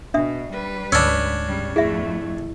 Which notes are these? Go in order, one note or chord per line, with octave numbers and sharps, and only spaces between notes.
B2 D4 E5 D#6
G3 B4
D2 G#2 C#4 D4 A5 E6
C#3 G3
F2 A3 E4 G#4 E5